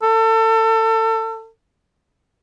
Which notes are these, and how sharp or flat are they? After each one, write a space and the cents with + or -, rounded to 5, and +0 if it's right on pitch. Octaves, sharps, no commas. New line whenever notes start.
A4 +30